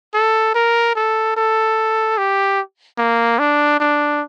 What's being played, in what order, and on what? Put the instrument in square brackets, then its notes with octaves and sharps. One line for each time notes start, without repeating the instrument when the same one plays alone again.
[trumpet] A4
A#4
A4
A4
G4
A#3
D4
D4